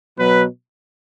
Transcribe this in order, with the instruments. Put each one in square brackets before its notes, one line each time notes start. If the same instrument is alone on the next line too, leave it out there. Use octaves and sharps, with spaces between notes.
[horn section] B2 F#3 B4